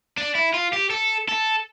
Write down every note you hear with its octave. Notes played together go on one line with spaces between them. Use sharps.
D4
E4
F4
G4
A4
A4